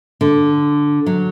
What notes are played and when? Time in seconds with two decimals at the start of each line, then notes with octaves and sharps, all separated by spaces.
0.21 D3
1.06 F#3